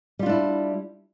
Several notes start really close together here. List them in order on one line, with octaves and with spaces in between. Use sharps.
G3 F4 D4 E4